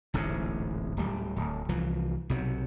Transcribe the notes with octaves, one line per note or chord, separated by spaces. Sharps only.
D1 A1 G#2 C3
D1 G3
D1
C2 E3 F3
B1 C3 F#3